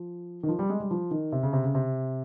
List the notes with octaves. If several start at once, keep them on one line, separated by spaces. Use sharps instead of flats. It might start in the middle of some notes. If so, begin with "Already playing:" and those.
Already playing: F3
D#3
F3
G3
G#3
G3
F3
D#3
C3
C#3
C3
C#3
C3